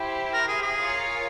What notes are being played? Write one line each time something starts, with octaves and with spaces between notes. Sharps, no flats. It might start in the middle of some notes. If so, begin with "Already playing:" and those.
Already playing: E4 G4 C5
A#4
G#4
G#4
F4 A#4 C#5 F5 G#5